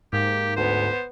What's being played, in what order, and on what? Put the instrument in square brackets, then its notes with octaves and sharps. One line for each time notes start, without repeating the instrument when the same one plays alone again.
[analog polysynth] G#2 [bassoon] A#3 [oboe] G4
[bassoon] D2 [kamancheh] B3 [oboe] C5